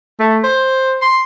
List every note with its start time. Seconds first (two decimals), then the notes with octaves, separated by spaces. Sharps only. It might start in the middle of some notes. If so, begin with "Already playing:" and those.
0.19 A3
0.44 C5
1.02 C6